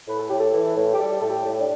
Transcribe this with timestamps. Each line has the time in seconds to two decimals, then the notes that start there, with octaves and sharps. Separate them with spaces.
0.08 A2 B4
0.19 A4
0.29 A2 G4
0.39 A4
0.53 E3
0.76 A2
0.94 G4
0.99 G3 A4
1.21 A2 A4
1.30 G4
1.44 A2
1.60 D4